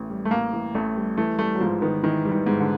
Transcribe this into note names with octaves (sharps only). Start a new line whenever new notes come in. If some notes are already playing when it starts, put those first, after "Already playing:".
Already playing: A1 A2 E3
G3
A3
A2 A#3
E3
A1 A3
G3
E3 A3
G3 A3
F#3
G#2 F3
D#3 B3
D#3 E3
G3
D#3
G#2
D3